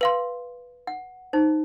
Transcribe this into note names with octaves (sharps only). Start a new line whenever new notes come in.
B4 F5 C6
F#5
D#4 C5